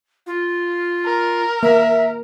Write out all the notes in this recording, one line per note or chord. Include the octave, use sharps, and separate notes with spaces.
F4
A#4
A#3 E5